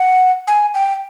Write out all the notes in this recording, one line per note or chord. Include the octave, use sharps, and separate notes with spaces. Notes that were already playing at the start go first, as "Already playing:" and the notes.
Already playing: F#5
G#5
G5